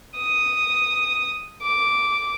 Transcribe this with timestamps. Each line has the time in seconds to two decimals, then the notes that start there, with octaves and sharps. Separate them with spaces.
0.17 D#6
1.62 D6